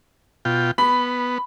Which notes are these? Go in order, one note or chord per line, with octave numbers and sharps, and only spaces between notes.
B2 F4 G5
B3 B5